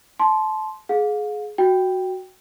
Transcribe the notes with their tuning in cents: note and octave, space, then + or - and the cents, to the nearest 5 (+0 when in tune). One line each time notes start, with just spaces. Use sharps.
A5 -25 C6 +0
G#4 +20 F5 +40
F#4 +0 G5 +0